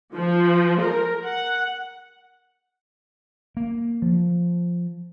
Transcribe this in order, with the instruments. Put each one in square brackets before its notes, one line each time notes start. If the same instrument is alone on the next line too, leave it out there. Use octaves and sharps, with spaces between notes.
[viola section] F3
A#4
F#5
[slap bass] A#3
F3